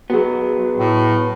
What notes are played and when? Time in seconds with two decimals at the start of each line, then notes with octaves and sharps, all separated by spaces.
0.10 F#3 B3 F#4 G#4
0.78 A2